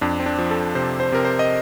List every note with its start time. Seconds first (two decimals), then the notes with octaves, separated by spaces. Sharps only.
0.01 F2 D4
0.20 C4
0.26 D4
0.39 F3
0.51 A4
0.75 C3 C5
1.00 C5
1.12 C3 A#4
1.25 C5
1.39 D#5